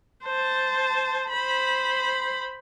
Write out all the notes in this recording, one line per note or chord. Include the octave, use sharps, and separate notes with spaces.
C5 A5
C5 B5